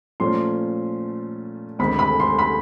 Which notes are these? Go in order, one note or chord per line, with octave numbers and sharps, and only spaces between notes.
A#2 F3 A3 C#4 C6
D2 C3 D#3 G#3 B5
B5
C6
B5